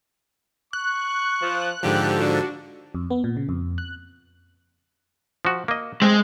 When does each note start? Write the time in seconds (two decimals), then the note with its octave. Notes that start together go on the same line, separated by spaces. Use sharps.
0.73 C#6 F#6
1.41 F3
1.83 G#2 D3 F3 G4 A4
2.20 D4 F#4
2.95 F2
3.10 B3
3.24 A#2
3.37 C#3
3.49 F2
3.78 F#6
5.45 F3 F#4
5.68 A#3 D#5
6.02 G#3 C4